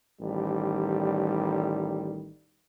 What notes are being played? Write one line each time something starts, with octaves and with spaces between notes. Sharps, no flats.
A1 D#3 G3